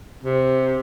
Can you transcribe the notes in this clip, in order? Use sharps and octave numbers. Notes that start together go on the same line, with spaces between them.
C3